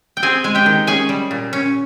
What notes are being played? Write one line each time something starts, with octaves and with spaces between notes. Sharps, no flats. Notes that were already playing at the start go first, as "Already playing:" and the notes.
G5
C4 G#4 G#5
G#3 G#5
G4 G5
D#3
C#4 G#4 G#5
G3
A#2
C#4